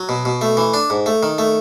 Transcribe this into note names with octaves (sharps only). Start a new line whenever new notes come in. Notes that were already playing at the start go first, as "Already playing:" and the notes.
Already playing: F#3
B2
B2
A3
E3
D4
G#2
A3
D#3
A3